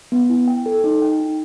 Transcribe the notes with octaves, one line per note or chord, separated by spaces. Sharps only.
B3
E4
G5
A4
D#4
G5
D#4